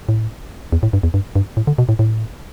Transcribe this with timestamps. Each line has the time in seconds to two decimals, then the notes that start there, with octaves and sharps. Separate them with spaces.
0.09 A2
0.72 E2
0.83 A2
0.93 G2
1.03 E2
1.14 G2
1.36 G2
1.57 A2
1.67 D3
1.78 B2
1.89 A2
1.99 A2